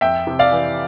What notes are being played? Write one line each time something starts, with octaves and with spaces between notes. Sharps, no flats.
F2 E5 G5
C3
D5 F5
E3